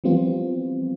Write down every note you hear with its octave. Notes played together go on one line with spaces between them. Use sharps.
E3 F3 G3 B3 C4 F4